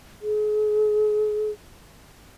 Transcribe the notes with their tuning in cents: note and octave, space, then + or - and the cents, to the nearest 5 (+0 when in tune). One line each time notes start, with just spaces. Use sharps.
G#4 +35